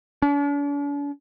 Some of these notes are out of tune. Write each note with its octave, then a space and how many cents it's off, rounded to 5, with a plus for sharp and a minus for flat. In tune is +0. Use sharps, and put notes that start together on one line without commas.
D4 -45